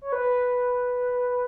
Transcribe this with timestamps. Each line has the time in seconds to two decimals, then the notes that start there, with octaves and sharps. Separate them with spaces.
0.02 C#5
0.12 B4